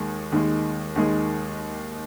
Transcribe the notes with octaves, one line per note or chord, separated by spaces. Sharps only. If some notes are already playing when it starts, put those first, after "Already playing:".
Already playing: D#2 D#3 G#3
D#2 D#3 G#3
D#2 D#3 G#3